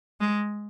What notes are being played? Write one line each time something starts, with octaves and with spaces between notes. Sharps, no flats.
G#3